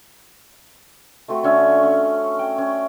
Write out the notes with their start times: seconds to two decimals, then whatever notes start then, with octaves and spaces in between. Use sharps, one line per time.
1.28 A3 C4 F#4
1.43 D3 C#4 E5
1.83 C#4
2.39 G5
2.58 C#4